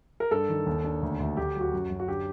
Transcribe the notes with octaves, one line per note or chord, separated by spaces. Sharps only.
A#4
G2 A4
D#3
D#2
D4
D2
D2
D2 G4
F#3
F#4
F#2
F#2
F#4
D3 G4